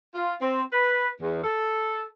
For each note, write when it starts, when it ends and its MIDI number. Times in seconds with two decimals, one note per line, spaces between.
0.15 0.34 65
0.41 0.63 60
0.73 1.09 71
1.22 1.44 40
1.44 2.05 69